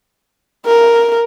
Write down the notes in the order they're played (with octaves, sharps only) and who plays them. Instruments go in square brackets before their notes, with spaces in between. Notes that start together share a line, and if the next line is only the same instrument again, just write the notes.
[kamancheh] A#4